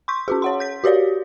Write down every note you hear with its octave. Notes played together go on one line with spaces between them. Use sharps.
C6 C#6 G6 B6
C#4 F#4 G#4
C#5 F#5 C6
G6 B6
F#4 G4 C#5 D5 F5